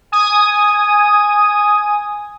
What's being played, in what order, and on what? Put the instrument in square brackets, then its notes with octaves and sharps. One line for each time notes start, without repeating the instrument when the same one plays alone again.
[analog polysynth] G#5 D#6